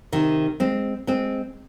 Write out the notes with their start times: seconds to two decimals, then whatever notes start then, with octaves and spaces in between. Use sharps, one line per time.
0.12 C3 D#3
0.60 G#3 C4
1.07 G#3 C4